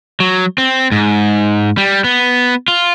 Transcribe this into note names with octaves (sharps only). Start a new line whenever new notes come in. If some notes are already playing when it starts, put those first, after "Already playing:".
F#3
C4
G#2
G3
B3
F4